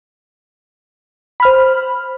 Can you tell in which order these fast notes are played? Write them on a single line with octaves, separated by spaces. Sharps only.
B5 F6 C5